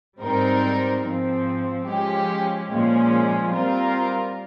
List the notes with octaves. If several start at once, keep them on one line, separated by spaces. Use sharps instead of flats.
G#2 G3 C4 D#4 A#4
G#2 F3 C4
F3 G#3 C#4 G4
A#2 F3 G#3 C#4
G3 C4 F4 A#4